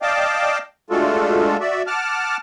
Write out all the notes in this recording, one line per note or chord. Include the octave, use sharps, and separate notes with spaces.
D5 D#5 F5 G5 A5 D6
G#3 A3 D4 F4 F#4 A4
F#4 D5 E5
F#5 A5 D6 F6